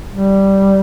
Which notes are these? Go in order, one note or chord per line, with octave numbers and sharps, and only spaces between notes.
G3